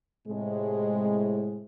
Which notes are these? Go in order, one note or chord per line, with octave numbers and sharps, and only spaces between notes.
A2 C3 G#3